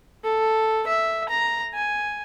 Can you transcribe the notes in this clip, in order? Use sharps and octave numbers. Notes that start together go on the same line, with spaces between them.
A4
E5
A#5
G#5